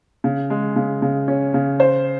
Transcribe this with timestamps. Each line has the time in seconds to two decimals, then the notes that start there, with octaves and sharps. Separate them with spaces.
0.24 C#3
0.50 G#3
0.76 C#3
1.02 C#3
1.28 C#4
1.54 C#3
1.80 C5